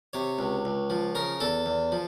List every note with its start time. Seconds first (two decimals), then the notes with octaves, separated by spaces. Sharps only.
0.13 C3 C#5
0.39 C#2
0.65 C#2
0.90 F3
1.15 C#3 A#4
1.40 E2 A4
1.66 E2
1.92 F3